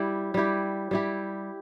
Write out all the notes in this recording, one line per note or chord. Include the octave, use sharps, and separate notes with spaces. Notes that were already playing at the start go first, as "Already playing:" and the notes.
Already playing: G3 E4 G4
G3 E4 G4
G3 E4 G4